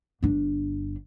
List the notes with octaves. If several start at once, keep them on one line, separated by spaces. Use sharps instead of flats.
G1 D4